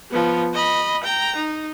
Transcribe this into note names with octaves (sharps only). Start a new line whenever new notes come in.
F3 B3
D#5 B5
G5 A#5
D#4